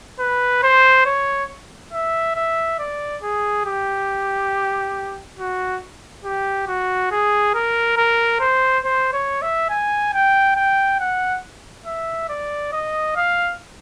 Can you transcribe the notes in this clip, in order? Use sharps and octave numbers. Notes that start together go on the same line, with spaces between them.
B4
C5
C#5
E5
E5
D5
G#4
G4
F#4
G4
F#4
G#4
A#4
A#4
C5
C5
C#5
E5
G#5
G5
G5
F#5
E5
D5
D#5
F5